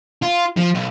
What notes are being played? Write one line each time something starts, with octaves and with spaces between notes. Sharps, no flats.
F4
F3
B1